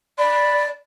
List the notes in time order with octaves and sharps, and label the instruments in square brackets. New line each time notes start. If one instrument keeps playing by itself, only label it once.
[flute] D5 [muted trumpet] B5